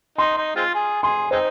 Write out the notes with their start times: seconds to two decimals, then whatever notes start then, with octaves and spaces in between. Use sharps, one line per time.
0.18 D#4 C6
0.37 D#4
0.56 G#3 C4 F4
0.75 G#4
1.03 G#4 C6
1.31 G#3 C4 D#4 C5